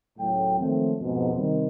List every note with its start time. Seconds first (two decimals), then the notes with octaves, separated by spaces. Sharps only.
0.19 C#2 A2 F#3 G5
0.59 D#3 F3 F#3 A3 A#3 C4
0.99 F2 G#2 B2
1.34 C3 D#3 G3 C4